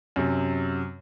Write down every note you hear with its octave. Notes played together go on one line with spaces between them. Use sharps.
F#2 C3